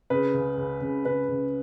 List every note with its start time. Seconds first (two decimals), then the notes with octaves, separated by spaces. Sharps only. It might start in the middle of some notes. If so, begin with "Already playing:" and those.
0.10 C#3 B4
0.34 C#2
0.57 C#2
0.81 C#2
1.05 C#3 B4
1.29 C#2